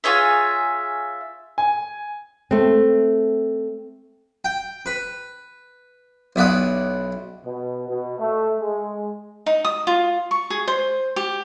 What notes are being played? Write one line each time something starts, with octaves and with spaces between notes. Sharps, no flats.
F4 G#4 C#5 E5
G#5
A3 C4
G5
B4
B1 E4 D5 F#5 D#6
B2
B2
A3
G#3
D#4
D#6
F4
C#6
G#4
C5
G4